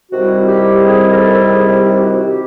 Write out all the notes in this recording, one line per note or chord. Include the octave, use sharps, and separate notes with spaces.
C3 D#3 G3 C4 E4 F#4
G4
G#4
A#4
A4
G#4
G4
F#4
G4